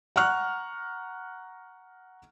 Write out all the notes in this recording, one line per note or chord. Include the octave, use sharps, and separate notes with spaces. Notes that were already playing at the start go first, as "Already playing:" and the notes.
F#5 A#5 C#6 F6 F#6